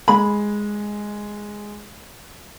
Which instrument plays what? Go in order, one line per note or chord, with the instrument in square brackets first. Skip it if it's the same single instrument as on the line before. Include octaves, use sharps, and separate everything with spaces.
[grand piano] G#3 [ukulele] B5